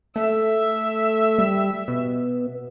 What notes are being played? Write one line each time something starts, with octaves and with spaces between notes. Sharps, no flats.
A3 E5
G3
B2